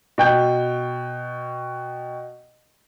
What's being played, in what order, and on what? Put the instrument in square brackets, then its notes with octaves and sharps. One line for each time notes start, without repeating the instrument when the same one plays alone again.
[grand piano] B2 G5 G6